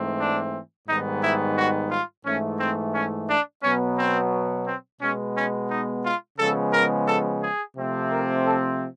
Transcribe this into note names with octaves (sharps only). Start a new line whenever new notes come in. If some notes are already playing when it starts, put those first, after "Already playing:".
Already playing: G#2 E3 A3 C4
D4
G#2 D#3 G3 B3 D#4
E4
F#4
F4
G#2 E3 A3 C#4
C4
C#4
D4
B2 F#3 B3 C#4
C4
C4
B2 G#3 B3 C#4
C#4
D#4
F4
C#3 F3 G#3 B3 A4
A#4
A4
G#4
C3 F3 A3 C4
A#4
A4